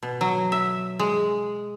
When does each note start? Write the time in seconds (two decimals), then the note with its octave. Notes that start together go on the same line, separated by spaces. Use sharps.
0.03 B2
0.21 F#3
0.52 E5
0.99 G#3